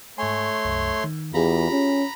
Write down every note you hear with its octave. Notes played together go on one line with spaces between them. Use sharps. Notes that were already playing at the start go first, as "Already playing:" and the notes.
G#2 A3 C#5 G#5 C6
C2 F#2
D#3
E2 F4 G4 G#4 A#5 B5
C#4